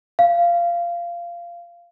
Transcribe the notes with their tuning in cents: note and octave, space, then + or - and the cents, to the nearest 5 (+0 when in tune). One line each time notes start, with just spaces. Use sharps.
F5 -15